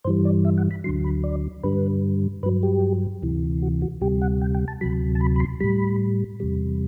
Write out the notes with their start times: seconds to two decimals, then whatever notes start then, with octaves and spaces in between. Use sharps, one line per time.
0.05 G2 E3 G3 C5
0.25 D5
0.45 E5
0.58 F#5
0.71 B5
0.84 D2 D3 F#3 C6
1.04 B5
1.24 D5
1.64 G2 D3 G3 B4
2.43 G2 B4
2.46 F#3
2.63 G4
3.22 D2 C3 E3
3.62 F#4
3.82 F#4
4.01 D2 C3 G3 G4
4.22 F#5
4.41 G5
4.54 G5
4.68 A5
4.81 D2 C3 F#3 B5
5.15 A5
5.21 B5
5.36 B5
5.40 C6
5.60 A2 G3 B5
6.40 E2 C3 G3